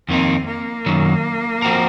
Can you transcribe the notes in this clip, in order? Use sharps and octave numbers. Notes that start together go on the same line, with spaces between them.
F2 D#3 A#3 C4 D#4
A#3
F#2 D#3 F#3
F3 C4 F#4 A#4